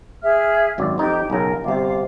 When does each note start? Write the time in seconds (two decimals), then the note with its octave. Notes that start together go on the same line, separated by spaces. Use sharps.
0.22 G#4 E5 F6
0.78 G#1 F#2 D5
0.98 F2 D#4 G4
1.30 B1 C#3 A#4
1.64 G1 C3 F4 D6